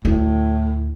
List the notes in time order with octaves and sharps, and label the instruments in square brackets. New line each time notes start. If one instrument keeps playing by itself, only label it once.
[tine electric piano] D2 [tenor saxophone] A2 [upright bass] E4